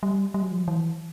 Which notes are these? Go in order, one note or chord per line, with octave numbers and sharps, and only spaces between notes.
G3
G3
F#3
F3
F#3
E3